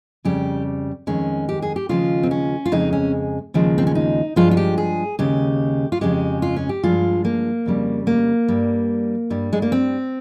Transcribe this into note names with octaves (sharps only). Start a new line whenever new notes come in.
F2 C#3 G3 G4
F2 D#3 G#3 C#4
G4
G#4
G4
D#2 C#3 F3 G#3 F4
C4
C#4
F4
F2 C#3 G#3 D#4
C#4
D#2 C#3 F3 G#3
C4
C#4
D#4
G2 F3 G#3 F4
F4
G4
G#4
D#2 C#3 G#3 G4
F4
F2 C#3 G#3 G4
F4
C#4
G4
G2 F3 G#3 F4
A#3
F2 C#3 G3
A#3
G2 G3
G2 G3
G#3
A#3
C4